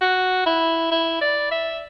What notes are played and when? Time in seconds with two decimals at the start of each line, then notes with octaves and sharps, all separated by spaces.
0.01 F#4
0.46 E4
0.91 E4
1.21 D5
1.51 E5